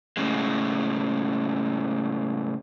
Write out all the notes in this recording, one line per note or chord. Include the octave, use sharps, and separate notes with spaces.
A2 C#3 G#3